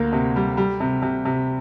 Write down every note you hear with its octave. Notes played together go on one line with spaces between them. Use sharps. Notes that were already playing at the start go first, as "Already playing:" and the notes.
Already playing: D2 A#3
C3
G3
G3
C3
C3
C3